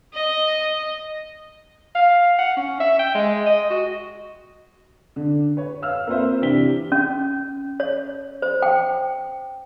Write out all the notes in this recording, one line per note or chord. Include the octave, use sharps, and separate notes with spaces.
D#5
F5
F#5
C#4
E5
G5
G#3
D#5
F#4
D3
B4 C#5
F5 E6 F6
A#3 C4 F4 B4 C5 E5
C3 E3 D4 G4 B6 G7
C#4
C#5
C5
G5